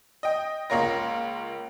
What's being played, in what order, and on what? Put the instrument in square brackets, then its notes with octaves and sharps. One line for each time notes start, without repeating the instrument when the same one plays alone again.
[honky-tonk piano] D#5 G5
C#2 A#3 F4 A#4 C#5 A#6